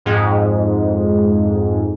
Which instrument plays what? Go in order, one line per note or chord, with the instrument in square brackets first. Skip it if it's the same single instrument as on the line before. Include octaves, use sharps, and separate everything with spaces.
[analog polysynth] F2 G#2